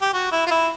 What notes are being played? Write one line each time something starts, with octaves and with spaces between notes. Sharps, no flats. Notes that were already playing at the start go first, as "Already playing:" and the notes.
G4
F#4
E4
F4
E4